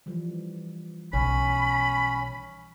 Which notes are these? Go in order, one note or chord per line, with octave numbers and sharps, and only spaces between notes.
E3 F3 G3
B1 C#4 C#5 B5